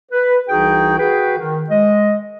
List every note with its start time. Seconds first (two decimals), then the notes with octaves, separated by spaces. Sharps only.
0.12 B4
0.49 C2 E3 D#4 F#4 G#4 G5
0.98 F#4 G#4 B4 G5
1.38 D#3
1.70 G#3 D#5